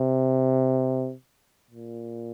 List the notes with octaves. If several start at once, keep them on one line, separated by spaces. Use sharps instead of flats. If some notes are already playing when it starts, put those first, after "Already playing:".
Already playing: C3
A#2